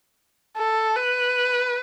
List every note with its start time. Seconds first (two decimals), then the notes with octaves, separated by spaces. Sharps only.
0.57 A4
0.96 B4